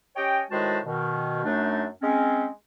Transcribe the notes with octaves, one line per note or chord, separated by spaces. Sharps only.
C#4 G4 C#5 D#5 G5
A2 D#3 G#3 F#4 C5 A5
B2 D#3
F#2 A3 D4 D#4
G#3 C4 C#4